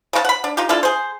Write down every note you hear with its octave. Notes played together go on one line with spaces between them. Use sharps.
C#3 F#4 A5
F#5 B5
D4
D#4 F4 G4
D4 E4 F4 A4
G#4 C5